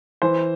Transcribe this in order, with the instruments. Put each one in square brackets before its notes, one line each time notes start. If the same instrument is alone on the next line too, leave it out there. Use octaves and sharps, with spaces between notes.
[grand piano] E3 C5